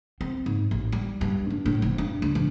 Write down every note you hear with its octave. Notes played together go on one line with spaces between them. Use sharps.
C4
G#2
A1
G3
G2
D4
A2
F1
G2
D2
A#1